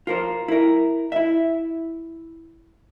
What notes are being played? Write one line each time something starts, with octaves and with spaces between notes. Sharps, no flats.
F4 A#4 C5
E4 A#4
E4 E5